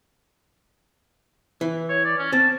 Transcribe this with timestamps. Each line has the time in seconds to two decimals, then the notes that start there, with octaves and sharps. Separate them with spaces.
1.61 E3
1.89 C#5
2.05 D5
2.18 C#4
2.32 C4 A5